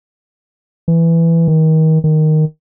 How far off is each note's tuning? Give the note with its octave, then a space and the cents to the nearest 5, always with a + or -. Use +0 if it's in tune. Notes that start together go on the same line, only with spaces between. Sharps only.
E3 +10
D#3 +30
D#3 -5